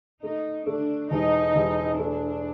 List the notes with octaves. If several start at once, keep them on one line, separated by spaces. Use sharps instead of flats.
A3 D#4
A3 D4
E1 D#4
E1
A3 D4